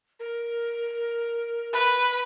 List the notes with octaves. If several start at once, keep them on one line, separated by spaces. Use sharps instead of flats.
A#4
B4